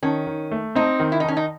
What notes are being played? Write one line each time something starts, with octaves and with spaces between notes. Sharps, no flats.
D#3 C#4
D#3
A3
C4 D#4
D#3
E4
D#4
D#3 C#4
D#4